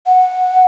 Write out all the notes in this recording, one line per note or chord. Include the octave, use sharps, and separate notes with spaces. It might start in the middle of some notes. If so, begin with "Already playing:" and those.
F#5